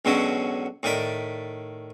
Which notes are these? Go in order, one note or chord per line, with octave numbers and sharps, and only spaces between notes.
C#2 B2 D3 F#3 C#4
A2 D#3 D5 B5